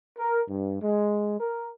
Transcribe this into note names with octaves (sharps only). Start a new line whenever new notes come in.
A#4
G2
G#3
A#4